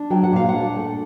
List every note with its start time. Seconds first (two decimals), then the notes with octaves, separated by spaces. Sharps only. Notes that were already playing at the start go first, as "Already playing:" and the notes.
Already playing: D4
0.10 F#3 G5
0.23 F#5
0.32 A#2 F5
0.49 F#5
0.54 D4
0.76 A3